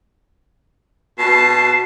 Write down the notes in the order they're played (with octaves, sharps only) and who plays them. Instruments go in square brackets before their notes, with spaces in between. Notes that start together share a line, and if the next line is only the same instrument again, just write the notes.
[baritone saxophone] B2 [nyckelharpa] A5 [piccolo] C7